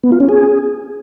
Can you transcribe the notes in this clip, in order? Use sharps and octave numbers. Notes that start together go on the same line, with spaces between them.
B3
F4
C#4
G#4